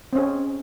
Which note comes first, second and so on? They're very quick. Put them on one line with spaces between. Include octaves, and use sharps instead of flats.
C4 C#4 G#4